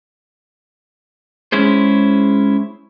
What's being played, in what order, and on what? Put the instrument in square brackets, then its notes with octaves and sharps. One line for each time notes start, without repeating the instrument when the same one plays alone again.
[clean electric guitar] G#3 C#4 E4 G#4 C5